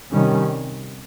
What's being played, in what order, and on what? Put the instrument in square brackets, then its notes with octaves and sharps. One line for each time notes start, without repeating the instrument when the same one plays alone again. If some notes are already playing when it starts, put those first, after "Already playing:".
[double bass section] C3 D#3 G3 C#4